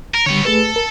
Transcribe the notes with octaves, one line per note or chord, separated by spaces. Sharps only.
A#4
D3 G3 B3 C#5
A3 G#4 A4 B4
A#4